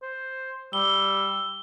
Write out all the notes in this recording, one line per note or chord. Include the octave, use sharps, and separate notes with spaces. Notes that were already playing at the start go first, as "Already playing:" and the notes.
C5
G3 E6 G7